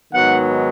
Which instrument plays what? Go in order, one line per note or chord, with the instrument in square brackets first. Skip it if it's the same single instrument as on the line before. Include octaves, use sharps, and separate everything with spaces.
[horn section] G#2 D#3 F#3 B3 F#5